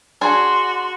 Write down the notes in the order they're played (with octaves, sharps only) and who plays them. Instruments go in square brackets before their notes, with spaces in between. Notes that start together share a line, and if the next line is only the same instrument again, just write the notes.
[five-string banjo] D4 G#4 G#5 [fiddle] F#4 [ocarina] C6